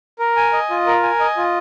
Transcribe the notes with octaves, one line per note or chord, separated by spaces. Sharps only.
A#4
G#5
D#5
F4
A#4
G#5
D#5
F4